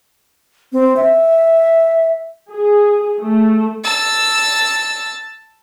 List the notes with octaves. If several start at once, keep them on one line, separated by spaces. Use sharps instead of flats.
C4
E5
G#4
A3
A5 E6